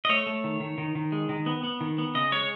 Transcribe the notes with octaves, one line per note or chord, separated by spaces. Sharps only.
D#5
A3 C#5
A3
D#3
D#3
D#3
D#3
G#3
D#3
B3
B3
D#3
B3
C#3 D#5
G#3 C#5